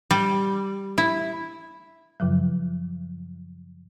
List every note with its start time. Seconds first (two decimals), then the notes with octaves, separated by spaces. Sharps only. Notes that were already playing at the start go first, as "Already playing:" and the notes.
0.11 G3
0.98 E4
2.20 F#2 C#3 F3 F#3